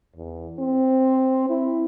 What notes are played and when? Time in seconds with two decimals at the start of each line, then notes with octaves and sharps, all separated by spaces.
0.16 E2
0.59 C4
1.50 E4